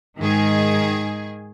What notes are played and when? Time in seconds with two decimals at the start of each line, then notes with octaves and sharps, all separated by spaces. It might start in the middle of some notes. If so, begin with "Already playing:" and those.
0.18 G#2 D#3 G#4